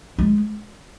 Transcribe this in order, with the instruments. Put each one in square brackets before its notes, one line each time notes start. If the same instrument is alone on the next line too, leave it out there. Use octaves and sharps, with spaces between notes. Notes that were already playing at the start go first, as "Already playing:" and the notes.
[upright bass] G#3